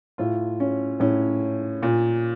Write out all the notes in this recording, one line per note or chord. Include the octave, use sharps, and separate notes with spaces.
A2 F4
C#4
A2 C#4
A#2